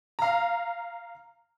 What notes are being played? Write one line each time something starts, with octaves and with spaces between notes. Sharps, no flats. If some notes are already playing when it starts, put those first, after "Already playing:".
F5 A#5